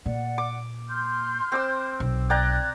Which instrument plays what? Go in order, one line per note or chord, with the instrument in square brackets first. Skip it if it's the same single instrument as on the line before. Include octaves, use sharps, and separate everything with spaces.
[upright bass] A#2 [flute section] D5 F#5
[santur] D6
[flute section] C6 F6 G6
[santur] C4 D6 E6
[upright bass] B1
[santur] D5 G5 A#5 [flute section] F#6 G#6